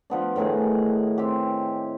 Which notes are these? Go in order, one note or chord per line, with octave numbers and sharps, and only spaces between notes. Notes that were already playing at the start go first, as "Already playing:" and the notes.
F3 B3 D4
A2 D#3 E4 G#4
C4 G4